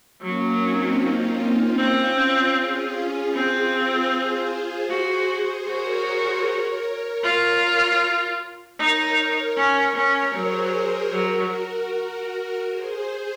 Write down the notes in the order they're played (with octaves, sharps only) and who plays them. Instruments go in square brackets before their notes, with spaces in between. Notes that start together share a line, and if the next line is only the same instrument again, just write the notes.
[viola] F#3 [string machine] A#3 C#4
[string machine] C4 D#4
C#4 F4
[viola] C4
[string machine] F4 G#4
[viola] C4 [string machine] F4 G#4
[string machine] G#4 C5
[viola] F#4
[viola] F#4 [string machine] A#4 C#5
[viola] F4
[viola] D#4 [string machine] A#4 C#5
[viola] C#4
C#4
[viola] F#3 [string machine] G#4 C5
[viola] F#3 [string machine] F#4 A#4
[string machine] G#4 C5